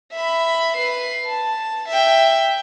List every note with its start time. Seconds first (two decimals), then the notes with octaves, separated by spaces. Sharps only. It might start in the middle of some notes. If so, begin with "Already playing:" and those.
0.13 E5 B5
0.77 B4 C7
1.27 A5
1.89 E5 G5